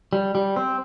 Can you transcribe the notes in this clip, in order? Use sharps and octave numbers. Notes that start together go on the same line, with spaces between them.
G3
G3
C4